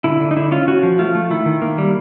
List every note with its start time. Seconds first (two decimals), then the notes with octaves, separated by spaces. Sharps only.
0.04 D3 E4
0.21 D3
0.31 D#4
0.36 D3 E4
0.52 C#4 F4
0.68 C#4 F#4
0.83 F3
0.99 A3 F4
1.15 A3
1.31 D#3 E4
1.46 D#3
1.62 A#3
1.78 G3